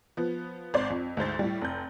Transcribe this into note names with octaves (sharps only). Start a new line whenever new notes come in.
F3 B3
G#1 C5 D5
F2
D2 G#2 C5 A6
A2 G3
F1 G6